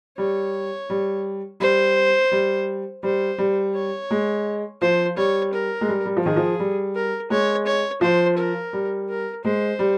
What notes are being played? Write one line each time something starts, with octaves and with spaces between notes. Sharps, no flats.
G3 C#5
G3
G3 C5
G3
G3 C5
G3
C#5
G#3
F3 C5
G3 C#5
A#4
G#3
G3
G3
F3
D#3 G#4
F3
G3
A#4
G#3 C#5
C#5
F3 C5
A#4
G3
A#4
G#3 C5
G3